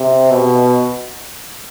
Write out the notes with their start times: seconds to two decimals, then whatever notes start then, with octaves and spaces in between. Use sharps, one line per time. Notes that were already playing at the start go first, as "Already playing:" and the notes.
Already playing: C3
0.31 B2